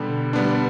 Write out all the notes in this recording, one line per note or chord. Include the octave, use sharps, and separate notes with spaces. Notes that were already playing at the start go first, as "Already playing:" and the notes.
Already playing: B2 D3 G3 B3
G3 B3 D4